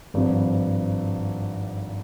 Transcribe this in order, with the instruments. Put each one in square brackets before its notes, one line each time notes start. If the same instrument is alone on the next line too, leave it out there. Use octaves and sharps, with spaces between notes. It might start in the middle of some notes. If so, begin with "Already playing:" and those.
[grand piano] G#1 G2 F3